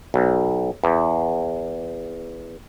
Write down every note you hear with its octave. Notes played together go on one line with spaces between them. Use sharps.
B1
E2